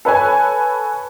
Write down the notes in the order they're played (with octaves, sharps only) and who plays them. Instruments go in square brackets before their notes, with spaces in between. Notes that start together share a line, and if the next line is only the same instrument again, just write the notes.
[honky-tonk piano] A4 B4 C#5 G#5